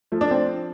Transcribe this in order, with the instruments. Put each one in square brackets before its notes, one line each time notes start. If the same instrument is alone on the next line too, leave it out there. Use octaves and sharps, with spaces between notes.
[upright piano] F3 A3
D4
C4